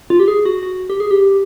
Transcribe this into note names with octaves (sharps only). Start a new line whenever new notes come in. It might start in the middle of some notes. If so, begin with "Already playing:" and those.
F4
G4
G#4
F#4
F#4
G4
G#4
G4